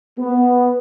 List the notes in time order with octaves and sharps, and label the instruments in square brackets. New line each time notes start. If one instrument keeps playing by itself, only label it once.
[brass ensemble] B3